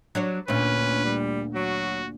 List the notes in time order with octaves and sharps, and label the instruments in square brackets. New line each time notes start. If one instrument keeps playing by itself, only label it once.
[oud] F#3 D4 C#5
[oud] D2 A#2 [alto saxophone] C#4 [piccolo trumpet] B4
[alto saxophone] G3
[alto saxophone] F#3 [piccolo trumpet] F#4